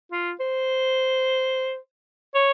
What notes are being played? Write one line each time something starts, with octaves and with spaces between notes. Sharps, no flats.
F4
C5
C#5